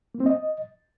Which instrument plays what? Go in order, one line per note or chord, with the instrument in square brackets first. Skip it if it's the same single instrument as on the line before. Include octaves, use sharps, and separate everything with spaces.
[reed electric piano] A#3
C4
D#5